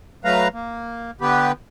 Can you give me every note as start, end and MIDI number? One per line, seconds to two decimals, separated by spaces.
0.25 0.48 54
0.25 0.48 57
0.25 0.48 71
0.25 0.48 77
0.25 0.48 82
0.53 1.11 58
1.21 1.52 50
1.21 1.52 59
1.21 1.52 67
1.21 1.52 71